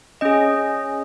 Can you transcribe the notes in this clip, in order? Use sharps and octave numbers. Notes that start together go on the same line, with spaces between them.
C#4 G#4 D#5